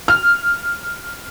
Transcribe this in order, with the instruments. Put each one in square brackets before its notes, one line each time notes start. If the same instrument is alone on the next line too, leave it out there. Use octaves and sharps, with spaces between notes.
[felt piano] F6